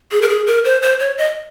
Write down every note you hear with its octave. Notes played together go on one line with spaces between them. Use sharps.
G#4
A#4
G#4
A#4
C5
C5
C#5
D#5